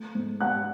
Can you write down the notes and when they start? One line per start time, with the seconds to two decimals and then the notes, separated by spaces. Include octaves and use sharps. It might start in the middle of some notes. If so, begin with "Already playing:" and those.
Already playing: A3
0.15 G#2
0.41 G#2 F#5 F#6